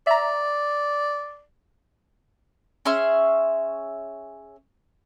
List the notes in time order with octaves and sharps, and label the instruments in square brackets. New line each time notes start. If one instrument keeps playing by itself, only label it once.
[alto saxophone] D5 [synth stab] E5 A#5
[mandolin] C#4 G#4 E5 C6